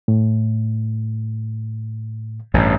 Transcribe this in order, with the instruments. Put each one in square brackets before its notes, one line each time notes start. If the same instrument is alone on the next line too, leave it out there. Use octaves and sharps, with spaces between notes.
[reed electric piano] A2
[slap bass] A1 G2